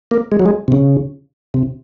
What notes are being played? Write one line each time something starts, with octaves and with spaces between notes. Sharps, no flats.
A#3
G#3
F#3
G#3
C3
C#3
C3